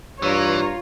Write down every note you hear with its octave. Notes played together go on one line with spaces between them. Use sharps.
G2 E3 F4 C#5 A#5